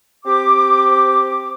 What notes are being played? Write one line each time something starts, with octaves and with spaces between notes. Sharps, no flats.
C4 G4 D6